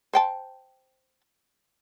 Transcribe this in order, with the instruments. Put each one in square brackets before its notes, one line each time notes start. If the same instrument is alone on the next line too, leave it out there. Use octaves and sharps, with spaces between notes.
[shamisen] C5 G5 A5